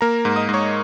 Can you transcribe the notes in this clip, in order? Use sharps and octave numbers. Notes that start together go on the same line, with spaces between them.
A#3 A#4 A#5
G#2
D#5 D#6
G#2
C#5 C#6